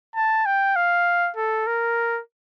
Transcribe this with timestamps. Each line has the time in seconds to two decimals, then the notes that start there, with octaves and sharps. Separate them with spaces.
0.16 A5
0.46 G5
0.76 F5
1.36 A4
1.67 A#4